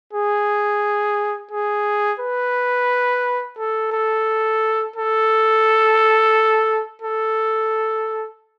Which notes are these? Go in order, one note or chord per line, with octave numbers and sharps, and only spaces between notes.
G#4
G#4
B4
A4
A4
A4
A4